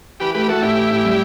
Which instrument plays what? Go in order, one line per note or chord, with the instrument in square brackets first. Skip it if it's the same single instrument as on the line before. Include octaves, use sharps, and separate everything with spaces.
[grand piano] E3 [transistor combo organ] G4 B4
[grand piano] A3 [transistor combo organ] G4 B4
[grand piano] A3 [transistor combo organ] F#4 A4
[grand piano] A2 [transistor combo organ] E4 G4
[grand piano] E3
A2
G3